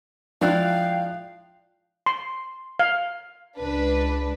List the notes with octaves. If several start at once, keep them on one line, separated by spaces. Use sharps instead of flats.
F3 G#3 D4 E4 F5 G5 F#6
C6
F5
C#2 D4 B4